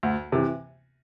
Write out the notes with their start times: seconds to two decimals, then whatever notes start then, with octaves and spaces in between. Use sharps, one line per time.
0.03 D2
0.32 C3 E3